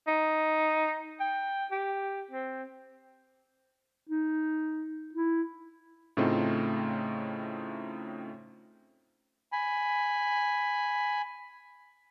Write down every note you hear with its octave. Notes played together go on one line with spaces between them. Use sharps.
D#4
G5
G4
C4
D#4
E4
A2 C#3 A3 C4 D#4 F4
G#5 B5